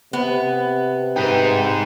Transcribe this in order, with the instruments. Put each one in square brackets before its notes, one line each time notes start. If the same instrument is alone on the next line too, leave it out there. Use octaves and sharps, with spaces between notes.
[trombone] C3 [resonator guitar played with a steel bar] B3
[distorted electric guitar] G#2 D#4 [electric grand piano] B4 G5